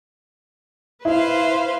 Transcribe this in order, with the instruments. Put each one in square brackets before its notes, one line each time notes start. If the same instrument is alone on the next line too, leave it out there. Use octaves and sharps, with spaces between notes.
[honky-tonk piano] E4 [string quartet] B4 C5 F5